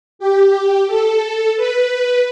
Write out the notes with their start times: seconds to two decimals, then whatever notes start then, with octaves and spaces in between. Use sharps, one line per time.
0.19 G4
0.87 A4
1.56 B4